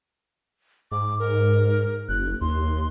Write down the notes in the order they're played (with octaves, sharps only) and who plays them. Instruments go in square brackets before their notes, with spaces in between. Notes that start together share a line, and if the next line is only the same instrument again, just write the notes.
[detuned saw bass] G#2 [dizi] D6
[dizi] A#4
[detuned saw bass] F#1 [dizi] F#6
[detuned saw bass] D#2 [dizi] C6